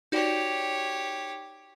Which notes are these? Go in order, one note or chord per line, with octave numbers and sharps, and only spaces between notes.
D#4 F#4 G4 C#5 D5